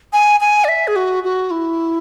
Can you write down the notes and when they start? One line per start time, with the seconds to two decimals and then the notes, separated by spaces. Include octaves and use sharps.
0.13 G#5
0.40 G#5
0.64 D5
0.68 E5
0.87 G#4
0.96 F#4
1.24 F#4
1.51 E4